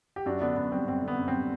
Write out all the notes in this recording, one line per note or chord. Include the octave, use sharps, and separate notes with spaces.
G4
F#2 D4 F#4
D3 B3 D4
F#2 B3
G3 C4
F#2 C4
D3
B3
F#2
C4
G3